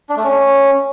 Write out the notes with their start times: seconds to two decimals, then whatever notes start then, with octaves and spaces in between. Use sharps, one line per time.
0.10 D4
0.17 A3
0.24 C#4